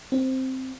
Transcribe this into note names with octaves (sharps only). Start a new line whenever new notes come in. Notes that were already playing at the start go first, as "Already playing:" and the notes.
C4